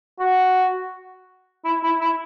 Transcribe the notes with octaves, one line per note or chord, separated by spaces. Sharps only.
F#4
E4
E4
E4